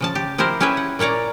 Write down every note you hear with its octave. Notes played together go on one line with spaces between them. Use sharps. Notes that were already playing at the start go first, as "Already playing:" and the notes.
C#3 F3 A5
G4
F3 E4 G4 A#4 C5
C#4 E4 G4 G#4 B4 E5
F#5
A#2 A#3 C#5 D5 A#5